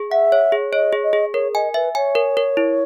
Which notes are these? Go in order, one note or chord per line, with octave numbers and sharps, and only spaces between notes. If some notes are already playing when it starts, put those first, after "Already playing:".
Already playing: G#4
E5 F#5
C#5
G#4
C#5 D#5
G#4
D#5
G#4
A#4 C#5
D#5 G#5
B4 E5
C#5 G#5
A#4
A#4
E4